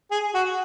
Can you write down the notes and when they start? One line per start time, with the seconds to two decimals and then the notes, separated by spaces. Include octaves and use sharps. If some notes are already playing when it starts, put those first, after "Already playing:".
0.11 G#4
0.34 F#4